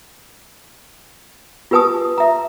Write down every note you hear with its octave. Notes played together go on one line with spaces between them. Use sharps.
F4 G4 B4 G#5 A5 D#6
E5 A#5